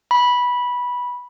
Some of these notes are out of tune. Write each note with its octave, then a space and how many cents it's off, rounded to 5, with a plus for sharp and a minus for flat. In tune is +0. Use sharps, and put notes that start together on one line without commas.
B5 -10